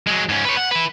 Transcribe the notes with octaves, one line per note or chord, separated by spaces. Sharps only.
F#3 G#3
G#2 C#4
B4 C#5
F#5
E4 B4